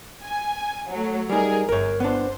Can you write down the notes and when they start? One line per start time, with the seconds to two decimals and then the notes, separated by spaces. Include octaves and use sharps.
0.23 G#5
0.91 F#3 A3
1.29 G3 D#4 G#4 A#4
1.69 G1 A#4 C#5
2.00 B3 D4 C5